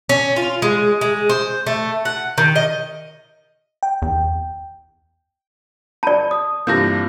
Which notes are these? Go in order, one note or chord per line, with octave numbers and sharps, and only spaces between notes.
C#4
F4
G#3
G#3
C5
A3
F#5
D#3
D#5
G5
E2
D5 A5 B5
D#6
G2 C3 E3 A#3 F4 A4 G6 A#6